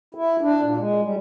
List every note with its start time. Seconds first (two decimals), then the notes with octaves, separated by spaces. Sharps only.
0.15 E4
0.41 D4
0.61 A#2
0.77 G#3
1.02 G3